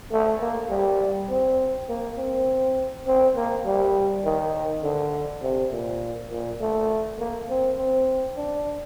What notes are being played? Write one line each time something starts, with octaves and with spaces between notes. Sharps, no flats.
A3
A#3
G3
C4
A#3
C4
C4
A#3
G3
D#3
D3
C3
A#2
A#2
A3
A#3
C4
C4
D4